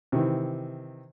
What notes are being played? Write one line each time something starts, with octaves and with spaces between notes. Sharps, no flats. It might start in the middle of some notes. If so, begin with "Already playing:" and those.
C3 D#3 E3